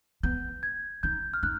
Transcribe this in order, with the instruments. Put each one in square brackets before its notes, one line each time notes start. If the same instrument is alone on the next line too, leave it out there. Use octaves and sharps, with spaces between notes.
[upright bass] B3 [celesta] G6
[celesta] G#6
[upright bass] D#4 [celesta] G6
[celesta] F6
[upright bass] D#4 [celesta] F#6